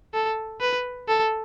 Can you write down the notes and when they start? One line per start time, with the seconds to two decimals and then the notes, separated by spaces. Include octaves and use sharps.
0.14 A4
0.61 B4
1.08 A4